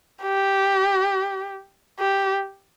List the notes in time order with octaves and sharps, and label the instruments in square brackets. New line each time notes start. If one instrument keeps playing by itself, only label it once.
[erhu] G4
G4